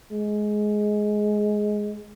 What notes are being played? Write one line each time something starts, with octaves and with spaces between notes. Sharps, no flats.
G#3